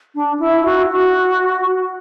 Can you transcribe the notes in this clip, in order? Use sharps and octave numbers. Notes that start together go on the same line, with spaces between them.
D4
E4
E4
F#4
F#4